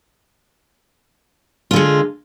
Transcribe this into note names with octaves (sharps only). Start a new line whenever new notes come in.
D3 G#3 F4